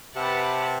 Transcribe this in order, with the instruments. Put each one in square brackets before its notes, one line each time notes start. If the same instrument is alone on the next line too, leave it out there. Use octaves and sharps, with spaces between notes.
[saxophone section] C3 [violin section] G4 B4 F#5 A5